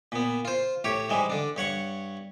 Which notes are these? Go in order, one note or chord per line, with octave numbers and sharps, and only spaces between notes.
A#2 B3
F4 C5
A2 G4 C#5
G#2 E3 G3 G#3
D3 D4
G2 C#5 F#5 C#6